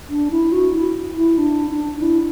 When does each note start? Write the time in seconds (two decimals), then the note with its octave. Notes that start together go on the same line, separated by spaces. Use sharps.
0.09 D4
0.31 E4
0.52 F#4
0.74 E4
1.16 E4
1.38 D4
1.70 D4
2.02 E4